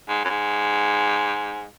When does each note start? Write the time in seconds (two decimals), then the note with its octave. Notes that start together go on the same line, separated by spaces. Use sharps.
0.09 G#2
0.25 F#2
0.29 G#2